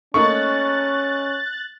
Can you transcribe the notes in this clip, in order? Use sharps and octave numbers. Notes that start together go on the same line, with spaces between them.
A3 A#3 C#4 D#4 C#6 F#6 A6